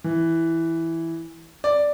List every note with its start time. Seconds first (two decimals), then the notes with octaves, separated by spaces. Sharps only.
0.04 E3
1.64 D5